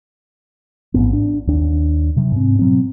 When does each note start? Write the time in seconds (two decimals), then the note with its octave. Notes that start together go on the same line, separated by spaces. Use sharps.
0.94 A1 G#2 B3
1.13 D4
1.47 D#2 D4
2.16 C3 F#3
2.32 G#2 C4
2.59 B2 F#3 C4